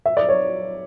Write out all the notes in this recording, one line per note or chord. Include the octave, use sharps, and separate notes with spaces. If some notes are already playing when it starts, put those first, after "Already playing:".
E5
D5
C#5